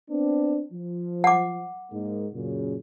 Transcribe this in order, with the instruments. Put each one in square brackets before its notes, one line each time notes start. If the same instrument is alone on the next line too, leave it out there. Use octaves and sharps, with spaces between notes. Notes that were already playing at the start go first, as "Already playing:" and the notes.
[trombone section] B3 C4 D4
F3
[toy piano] F#5 D6
[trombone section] G#2 G#3 A#3
F#2 A#2 C#3